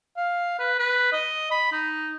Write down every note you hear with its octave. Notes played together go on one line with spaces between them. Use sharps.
F5
B4
B4
D#5
B5
D#4